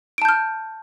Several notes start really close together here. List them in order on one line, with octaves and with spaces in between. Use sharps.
D7 A5 G6 F6